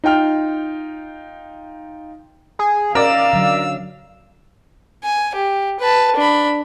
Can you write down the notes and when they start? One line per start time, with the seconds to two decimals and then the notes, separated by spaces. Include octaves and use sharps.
0.04 D#4 F4 G5 F6
2.59 G#4
2.95 C#4 A#4 D5 D#5 F5 E6
3.33 D3 F#3
5.04 G#5
5.35 G4
5.80 B4 A5
6.16 D4 B5